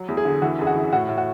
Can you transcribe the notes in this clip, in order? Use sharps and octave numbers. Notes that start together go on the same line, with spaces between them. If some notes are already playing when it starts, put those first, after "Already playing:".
Already playing: F#3
E2
G#4
D3
E3 F#4
F#2 G#4
F#4
E3
A2 F#4
A2
F#4